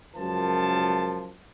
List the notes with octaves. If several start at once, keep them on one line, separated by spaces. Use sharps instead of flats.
C#2 F#2 F3 A#4 A5